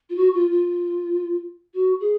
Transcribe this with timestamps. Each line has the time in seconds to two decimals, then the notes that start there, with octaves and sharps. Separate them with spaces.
0.10 F4
0.16 F#4
0.34 F4
0.51 F4
1.74 F#4
2.00 G#4